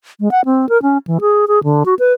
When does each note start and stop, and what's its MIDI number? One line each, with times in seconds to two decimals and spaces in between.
0.20 0.31 56
0.31 0.45 78
0.45 0.69 60
0.69 0.81 70
0.82 0.98 61
1.07 1.18 52
1.21 1.45 68
1.48 1.62 68
1.64 1.83 50
1.86 1.94 66
1.99 2.13 71